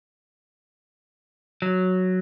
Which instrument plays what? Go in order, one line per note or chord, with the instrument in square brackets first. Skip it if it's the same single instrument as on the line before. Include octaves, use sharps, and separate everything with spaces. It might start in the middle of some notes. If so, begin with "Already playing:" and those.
[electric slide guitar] F#3